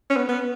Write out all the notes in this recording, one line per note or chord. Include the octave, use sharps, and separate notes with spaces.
C#4
B3
B3